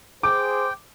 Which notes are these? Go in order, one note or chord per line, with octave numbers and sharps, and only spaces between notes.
G#4 C5 G5 D6